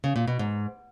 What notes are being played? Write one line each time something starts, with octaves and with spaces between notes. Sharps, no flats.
C#3
A#2
B2
G#2